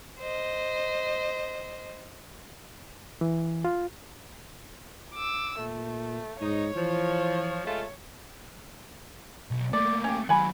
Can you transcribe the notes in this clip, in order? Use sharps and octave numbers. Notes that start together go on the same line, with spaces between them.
C5 D#5
E3
F4
D6 E6
A#2 A3
G#2 D#4 C#5
E3 F3
G#3 A3 F4
B1
A3 A#3 D5
C#4 G4
D#3 F#3 F#5 G#5 B5